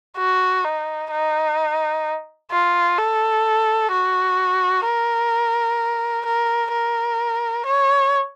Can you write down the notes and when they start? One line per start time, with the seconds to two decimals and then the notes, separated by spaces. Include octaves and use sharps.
0.18 F#4
0.64 D#4
1.11 D#4
2.52 F4
2.98 A4
3.92 F#4
4.86 A#4
6.26 A#4
6.72 A#4
7.66 C#5